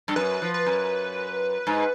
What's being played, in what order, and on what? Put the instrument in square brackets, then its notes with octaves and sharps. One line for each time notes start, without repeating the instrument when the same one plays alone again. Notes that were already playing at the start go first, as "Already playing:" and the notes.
[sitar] G2
[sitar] F#2 [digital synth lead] B4
[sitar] F3
[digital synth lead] B4
[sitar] F#2
G#2